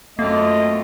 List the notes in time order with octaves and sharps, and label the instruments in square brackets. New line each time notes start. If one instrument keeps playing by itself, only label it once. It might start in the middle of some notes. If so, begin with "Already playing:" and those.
[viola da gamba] F#2 C4 F4 [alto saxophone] A3 [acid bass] A#3 [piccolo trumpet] D#5